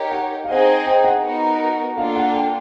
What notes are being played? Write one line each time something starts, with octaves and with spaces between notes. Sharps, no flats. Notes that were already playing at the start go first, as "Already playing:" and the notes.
Already playing: D#4 G4 A#4 C#5
F#5
F5
C4 D#4 G#4 C5 D#5 F#5
G5
F#5
B3 D#4 F#4 A#4
A#3 D4 F4 A4 F5
F#5
G5